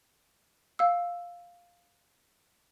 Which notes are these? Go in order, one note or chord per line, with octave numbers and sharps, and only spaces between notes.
F5 E6